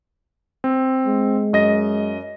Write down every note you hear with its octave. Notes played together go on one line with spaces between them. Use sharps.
C4
G#3
F#2 D#5 A#6